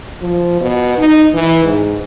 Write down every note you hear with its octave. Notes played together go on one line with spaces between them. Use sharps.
F3
B2
D#4
E3
G#2